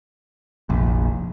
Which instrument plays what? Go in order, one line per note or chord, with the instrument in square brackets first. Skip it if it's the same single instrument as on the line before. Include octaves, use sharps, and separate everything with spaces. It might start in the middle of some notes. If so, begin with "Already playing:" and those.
[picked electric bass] F1 A#1